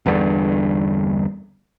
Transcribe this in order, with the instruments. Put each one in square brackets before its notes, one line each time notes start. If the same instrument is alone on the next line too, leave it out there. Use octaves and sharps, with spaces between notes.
[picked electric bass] G1 E2 G2 D3